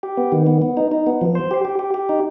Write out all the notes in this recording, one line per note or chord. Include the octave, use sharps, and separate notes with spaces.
G4
B3
D#3
B3
B3
D#4
D#4
B3
F3
C5
G4
G4
G4
G4
D#4